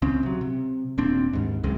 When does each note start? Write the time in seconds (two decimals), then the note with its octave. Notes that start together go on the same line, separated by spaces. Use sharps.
0.02 C#2 C#3 C4
0.23 C3 F#3
0.41 C3
0.98 D#1 A#2 C4 D4
1.33 D#2 G#2
1.64 C#2 F#2 C3 G#3